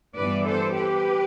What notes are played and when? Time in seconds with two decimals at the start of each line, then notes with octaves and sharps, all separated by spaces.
0.17 G2 E3 B3 B4 D5
0.47 A4 C5
0.76 G4 B4